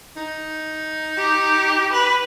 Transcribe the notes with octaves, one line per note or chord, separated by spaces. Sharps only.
D#4
G4
B4